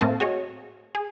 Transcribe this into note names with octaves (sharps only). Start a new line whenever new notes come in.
A2 A3 A#3 C4 A5
F#4 G#4 C#5 D#5
G#4